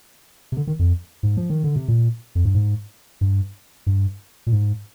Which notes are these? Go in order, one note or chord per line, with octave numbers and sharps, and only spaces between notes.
C3
D3
D#3
F2
G#2
F3
D#3
D3
C3
A#2
F2
G2
G#2
G2
G2
A#2
G#2